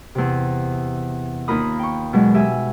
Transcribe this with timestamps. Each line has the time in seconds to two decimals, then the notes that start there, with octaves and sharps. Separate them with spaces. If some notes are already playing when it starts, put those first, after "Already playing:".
0.15 E2 C3
1.48 D#2 D#4 F4 A#4 B5 D#6
1.79 G5 C#6
2.13 B2 F#3 G#3
2.34 G4 E5 G#5 E6